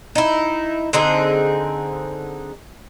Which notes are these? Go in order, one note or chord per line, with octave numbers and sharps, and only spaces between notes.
D#4 E4
D3 C4 D#4 G#4